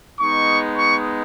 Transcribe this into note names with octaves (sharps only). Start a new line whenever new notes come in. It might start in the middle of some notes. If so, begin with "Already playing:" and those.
G#3 B3 D#4 C#6
C#6